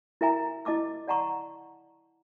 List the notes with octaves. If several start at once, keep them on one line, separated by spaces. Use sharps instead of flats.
E4 A#4 E5 G#5 A#5
E4 D#5 A5 D6 E6
D5 F#5 A5 A#5 C#6